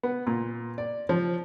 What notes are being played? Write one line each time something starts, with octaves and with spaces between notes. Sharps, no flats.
B3
A#2
D5
F3